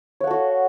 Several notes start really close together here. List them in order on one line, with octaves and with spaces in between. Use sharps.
C#5 F#5 A4 F#4